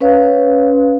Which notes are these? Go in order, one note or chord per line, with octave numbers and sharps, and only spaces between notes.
C#4 B4 C#5 F5